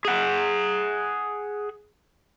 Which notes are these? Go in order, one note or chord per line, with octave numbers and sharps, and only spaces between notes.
G#4 F#5